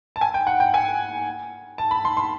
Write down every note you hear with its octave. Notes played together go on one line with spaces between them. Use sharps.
A5
G#5
G5
F#5
G5
G#5
A5
B5
C6
C6